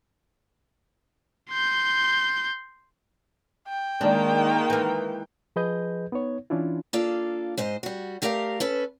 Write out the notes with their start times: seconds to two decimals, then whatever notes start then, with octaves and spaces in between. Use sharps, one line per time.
1.50 C6 G6
3.69 G5
4.01 D#3 G#3 A#3 D4
4.70 E3 A#4
5.56 F3 G#4 B4 D#5 G6
6.12 B3 D#4 C#5
6.50 E3 C#4 D4 E4 F4
6.93 A#3 D4 F4 A4 D5 F5
7.58 G#2 C5 D#5
7.83 G3 F#4
8.22 A3 G4 A#4 D5 E5 F5
8.60 C#4 A4 B4